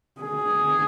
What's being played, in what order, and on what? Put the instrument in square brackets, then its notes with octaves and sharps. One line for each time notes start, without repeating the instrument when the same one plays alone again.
[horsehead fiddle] G#4